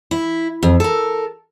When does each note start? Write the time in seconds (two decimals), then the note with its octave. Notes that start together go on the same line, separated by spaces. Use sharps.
0.11 E4
0.63 F2
0.80 A4 A#4